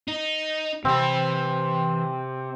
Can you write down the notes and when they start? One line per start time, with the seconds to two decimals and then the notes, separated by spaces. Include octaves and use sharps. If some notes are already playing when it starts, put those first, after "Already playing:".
0.08 D#4
0.85 C3 E3 C4 B5